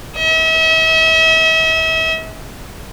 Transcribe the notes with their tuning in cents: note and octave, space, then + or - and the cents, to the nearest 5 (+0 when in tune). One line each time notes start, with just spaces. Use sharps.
E5 -40